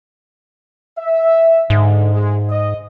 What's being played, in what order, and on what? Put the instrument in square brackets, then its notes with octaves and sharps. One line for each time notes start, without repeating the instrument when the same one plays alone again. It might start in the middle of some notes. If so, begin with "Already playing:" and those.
[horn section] E5
[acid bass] G#2 [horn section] D3
[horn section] G#3
D#5